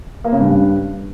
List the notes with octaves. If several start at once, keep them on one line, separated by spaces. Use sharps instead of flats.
A#3
C#3
G2